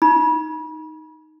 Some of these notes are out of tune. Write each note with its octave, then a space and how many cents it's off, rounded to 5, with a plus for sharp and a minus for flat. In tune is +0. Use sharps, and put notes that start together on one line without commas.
D#4 +0 B5 -40